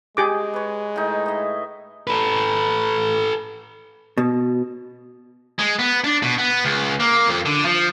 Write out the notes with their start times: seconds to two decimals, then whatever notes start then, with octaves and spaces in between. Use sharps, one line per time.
0.17 G#3 G4 G#4 D6
0.54 B4 C#5
0.96 A2 D#4
1.26 D#5 E5
2.07 A4 B4
4.17 B2
5.59 G#3
5.79 B3
6.04 D4
6.23 B2
6.38 B3
6.65 C#2
7.00 A#3
7.28 F2
7.46 D3
7.65 F3